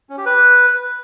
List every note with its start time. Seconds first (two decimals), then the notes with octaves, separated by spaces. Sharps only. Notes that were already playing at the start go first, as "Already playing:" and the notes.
0.09 C#4
0.18 G4
0.26 B4